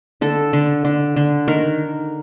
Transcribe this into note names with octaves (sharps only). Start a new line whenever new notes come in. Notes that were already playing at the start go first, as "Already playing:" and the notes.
D3 A4
D3
D3
D3
D#3 A#4